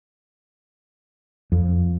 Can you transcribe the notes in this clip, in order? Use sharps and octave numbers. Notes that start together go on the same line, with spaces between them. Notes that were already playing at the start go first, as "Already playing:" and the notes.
F2